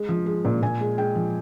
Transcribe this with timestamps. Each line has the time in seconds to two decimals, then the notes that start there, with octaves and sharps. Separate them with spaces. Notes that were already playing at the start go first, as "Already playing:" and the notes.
Already playing: G#3
0.09 F3
0.26 G#3
0.45 A#2
0.62 A#2 G#5
0.81 G#3
0.98 G#3 G5
1.15 F3